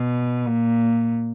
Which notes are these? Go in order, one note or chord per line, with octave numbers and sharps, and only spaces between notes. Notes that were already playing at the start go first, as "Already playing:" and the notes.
Already playing: B2
A#2